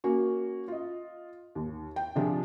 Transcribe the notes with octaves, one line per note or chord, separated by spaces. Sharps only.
A#3 C#4 F#4
F4 D#5
D#2
G5
C3 D#3 F3 D4 F4 G#4